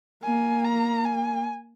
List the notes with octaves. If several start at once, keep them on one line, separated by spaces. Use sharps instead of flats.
A#3 G#5
A#5
G#5